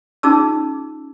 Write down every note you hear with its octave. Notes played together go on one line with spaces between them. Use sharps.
C#4 D#4 F4 G#4 A5 E6